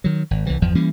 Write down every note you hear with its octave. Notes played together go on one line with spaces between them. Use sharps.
D#3 F#3
G#1
C2 E3
G1 E2 F3
E3 G3 A#3 C#4